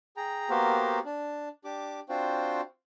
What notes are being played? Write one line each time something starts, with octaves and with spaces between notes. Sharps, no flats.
G#4 G5 A#5
A#3 B3 F#4 G4 A#4 C5
D4
D4 G4 D6
C4 D4 F4 F#4 C5 G5